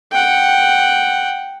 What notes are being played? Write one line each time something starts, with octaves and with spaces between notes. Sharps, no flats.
F#5 G5